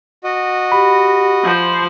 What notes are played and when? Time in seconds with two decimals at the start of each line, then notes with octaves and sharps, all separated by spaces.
0.24 F#4 D#5
0.72 G4 B5
1.44 F3 C5